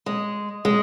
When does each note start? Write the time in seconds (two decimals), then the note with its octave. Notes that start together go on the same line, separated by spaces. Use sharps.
0.06 G#3
0.65 G#3